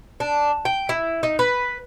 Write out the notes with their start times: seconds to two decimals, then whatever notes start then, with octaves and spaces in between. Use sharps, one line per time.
0.20 D4
0.65 G5
0.89 E4
1.23 D#4
1.39 B4